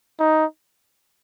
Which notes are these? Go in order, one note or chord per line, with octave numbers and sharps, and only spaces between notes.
D#4